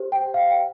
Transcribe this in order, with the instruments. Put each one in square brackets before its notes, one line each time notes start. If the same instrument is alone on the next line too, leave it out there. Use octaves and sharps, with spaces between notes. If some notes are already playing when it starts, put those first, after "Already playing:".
Already playing: [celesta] G4 C5
G5
F5
G5